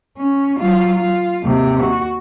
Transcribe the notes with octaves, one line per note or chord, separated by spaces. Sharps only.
C#4
F#3 F4
F4
D#2 C3
F#4